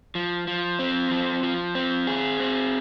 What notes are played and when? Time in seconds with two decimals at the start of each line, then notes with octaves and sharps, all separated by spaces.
0.15 F3
0.47 F3
0.79 C4
1.11 F3
1.43 F3
1.75 C4
2.07 G#4
2.40 C4